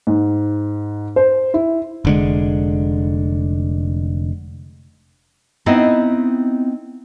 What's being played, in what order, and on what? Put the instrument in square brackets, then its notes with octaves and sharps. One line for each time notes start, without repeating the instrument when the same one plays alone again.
[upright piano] G#2
C5
E4
[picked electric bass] F1 D3 G#3
[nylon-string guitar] B3 C4 D#4 E4 D#5